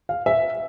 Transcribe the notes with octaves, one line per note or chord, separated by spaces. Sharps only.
F5
E5